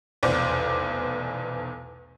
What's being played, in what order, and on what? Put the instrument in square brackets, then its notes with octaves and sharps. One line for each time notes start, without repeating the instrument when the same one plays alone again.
[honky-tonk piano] F1 B1 E2 C5 D5 D6